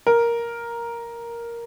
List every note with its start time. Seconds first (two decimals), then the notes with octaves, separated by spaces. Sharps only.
0.07 A#4